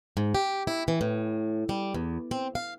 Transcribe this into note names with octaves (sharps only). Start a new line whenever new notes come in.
G#2
G4
E4
E3
A2
G3
E2
C4
F5